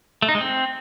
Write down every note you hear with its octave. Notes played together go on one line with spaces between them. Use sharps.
A3
D#4
G#3
C4